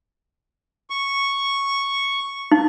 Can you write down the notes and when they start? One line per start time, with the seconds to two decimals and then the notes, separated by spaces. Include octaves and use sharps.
0.90 C#6
2.52 D#4